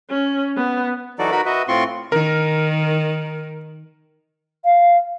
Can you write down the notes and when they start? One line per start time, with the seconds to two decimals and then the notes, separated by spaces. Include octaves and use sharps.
0.10 C#4
0.56 B3
1.19 E3 F#3 D#4 F#4 A4 D5
1.32 D#4 F#4 A#4 B4 B5
1.46 F#4 B4 D#5 E5
1.68 A2 C4 F4 C6 C#6
2.12 D#3 A#4
4.65 F5